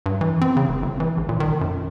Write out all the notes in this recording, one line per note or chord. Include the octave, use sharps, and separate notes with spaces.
G2
E3
C4
C#3
F1
G1
E3
A#1
A#2
D#3
F#2